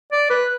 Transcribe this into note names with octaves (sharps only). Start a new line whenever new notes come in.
D5
B4